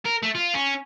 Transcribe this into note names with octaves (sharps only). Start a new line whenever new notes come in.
A#4
A3
F4
C#4